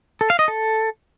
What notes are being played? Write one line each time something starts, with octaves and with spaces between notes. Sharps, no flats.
A4
F5
D#5
A4